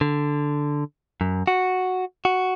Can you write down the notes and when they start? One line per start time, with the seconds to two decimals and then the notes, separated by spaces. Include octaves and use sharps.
0.01 D3
1.21 F#2
1.47 F#4
2.25 F#4